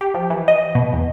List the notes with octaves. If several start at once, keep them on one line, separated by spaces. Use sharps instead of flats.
G4
F3
E3
D#5
B2
E2